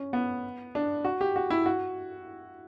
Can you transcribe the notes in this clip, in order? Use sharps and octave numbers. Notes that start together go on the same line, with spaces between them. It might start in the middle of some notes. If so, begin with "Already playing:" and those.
Already playing: C#4
B3
D4
F#4
G4
F#4
E4
F#4